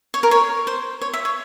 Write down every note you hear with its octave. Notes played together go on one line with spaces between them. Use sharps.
C#5
A#4
C#5
C5
C#5
E5
C#5